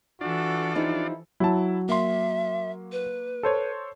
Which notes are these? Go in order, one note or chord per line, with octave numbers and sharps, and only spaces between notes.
E3 D4 F4 F#4 A4 D5
F3 D#4 E4 G4
F#3 E4 A5
A#3 E5 C6
B4
A4 C5 C#5